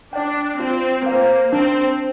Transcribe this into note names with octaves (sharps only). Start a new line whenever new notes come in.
D4 D5 G5
C4 F4
A#3 C5 F5
C4 D4